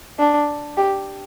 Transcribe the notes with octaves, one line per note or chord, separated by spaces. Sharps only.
D4
G4